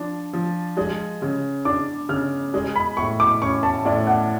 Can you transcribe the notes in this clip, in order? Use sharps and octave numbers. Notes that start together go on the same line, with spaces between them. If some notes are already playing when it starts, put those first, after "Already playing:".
Already playing: F3 D4
F3
G#3
C#3
D4 D6
C#3 F6
G#3
B5
A2 C#6
D6
C#4 C#6
A5
A2 D5
F#5